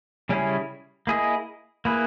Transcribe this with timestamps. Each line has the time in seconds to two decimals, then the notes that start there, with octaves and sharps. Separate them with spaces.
0.29 C#3 G3 C#4 E4 G#4
1.07 A#3 E4 G#4 D#5
1.85 A#3 E4 G#4 B4